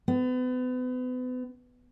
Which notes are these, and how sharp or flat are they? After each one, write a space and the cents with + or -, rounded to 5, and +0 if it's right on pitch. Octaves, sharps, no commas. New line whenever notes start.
B3 +35